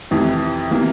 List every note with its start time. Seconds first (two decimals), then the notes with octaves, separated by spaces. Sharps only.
0.11 F2 C3 E3
0.71 C3 E3 A#3